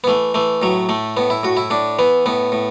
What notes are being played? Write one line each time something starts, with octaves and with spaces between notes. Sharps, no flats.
B3
E3 A3
E3 A3
A2 F#3
A2 A3
A2 B3
E4
A2 F#4
E4
A2 D4
E3 B3
A2 B3
A2